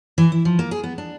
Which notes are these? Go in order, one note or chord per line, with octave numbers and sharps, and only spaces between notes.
E3
E4
F3
A#3
G#4
B3
D4